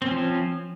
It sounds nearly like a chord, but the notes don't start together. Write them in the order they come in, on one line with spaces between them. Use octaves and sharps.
C4 C#4 F3